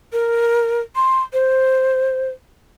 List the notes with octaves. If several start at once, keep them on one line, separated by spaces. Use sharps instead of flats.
A#4
C6
C5